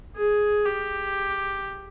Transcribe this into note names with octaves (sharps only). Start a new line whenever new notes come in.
G#4
G4